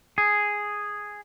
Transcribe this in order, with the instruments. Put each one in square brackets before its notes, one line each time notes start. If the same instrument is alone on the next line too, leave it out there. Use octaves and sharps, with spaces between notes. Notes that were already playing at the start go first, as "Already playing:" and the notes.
[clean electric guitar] G#4